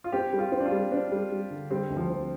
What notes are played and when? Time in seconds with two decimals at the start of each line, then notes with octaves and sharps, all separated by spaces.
0.04 F4
0.12 C4 G4
0.33 G3
0.39 F4
0.52 C4
0.60 D4
0.66 F4
0.71 G3
0.91 C4 D4
1.11 G3
1.31 G3
1.50 D3
1.70 G3 C4
1.90 D2
1.97 F3
2.10 C4